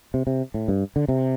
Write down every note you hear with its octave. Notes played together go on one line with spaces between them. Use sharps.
C3
C3
A2
G2
D3
C3